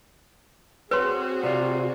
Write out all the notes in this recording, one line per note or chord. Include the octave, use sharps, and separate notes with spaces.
C4 F#4 G#4 B4 C#5 C6
C3 F4 D5